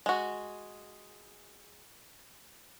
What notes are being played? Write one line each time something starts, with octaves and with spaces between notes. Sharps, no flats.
G#3 F#4